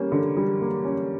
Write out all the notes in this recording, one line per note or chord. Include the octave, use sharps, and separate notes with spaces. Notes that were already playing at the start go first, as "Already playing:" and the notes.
Already playing: G3 A#3 C#4
D3
G3
A#3
C#4